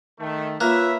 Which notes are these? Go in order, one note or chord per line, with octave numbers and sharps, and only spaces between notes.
D#3 A3
A#3 F4 B4 C#5 E5 F#6